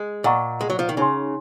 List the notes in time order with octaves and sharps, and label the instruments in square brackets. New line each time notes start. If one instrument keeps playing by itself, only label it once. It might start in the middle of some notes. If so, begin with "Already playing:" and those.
Already playing: [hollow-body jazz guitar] G#3
[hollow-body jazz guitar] A#2 [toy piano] A#4 D#5 F#5 A#5 C#6
[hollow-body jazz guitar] G#3
F#3
F3
D#3
[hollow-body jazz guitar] C#3 [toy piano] D#4 A#4 C#5 G#5 C6